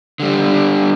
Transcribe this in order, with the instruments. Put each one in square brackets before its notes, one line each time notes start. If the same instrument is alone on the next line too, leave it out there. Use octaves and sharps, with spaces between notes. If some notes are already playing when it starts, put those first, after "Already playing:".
[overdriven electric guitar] D3 G3